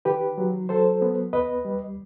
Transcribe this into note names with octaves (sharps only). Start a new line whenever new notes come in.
D#3 G4 B4
F#3
F#3 A4 C5
B3
D#2 B4 D#5
G3